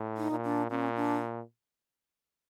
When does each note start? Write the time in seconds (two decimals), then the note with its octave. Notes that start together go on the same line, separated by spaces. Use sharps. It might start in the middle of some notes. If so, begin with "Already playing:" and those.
Already playing: A2
0.17 D#4
0.31 A#2
0.44 D4
0.70 A#2 C#4
0.96 D4